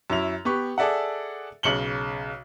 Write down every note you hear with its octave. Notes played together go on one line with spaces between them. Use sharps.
F#2 E4 F7
B3 G4 C#6
G#4 A4 D5 E5 F#5
B1 C#3 C#7 F#7 G7